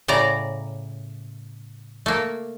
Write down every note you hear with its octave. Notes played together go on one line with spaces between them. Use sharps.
A2 C#3 D5 A#5
A3 A#3